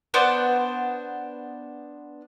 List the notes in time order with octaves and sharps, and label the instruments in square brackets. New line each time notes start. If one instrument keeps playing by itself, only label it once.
[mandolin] B3 D4 C5